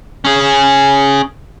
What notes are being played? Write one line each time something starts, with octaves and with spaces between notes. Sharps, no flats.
C#4 G#4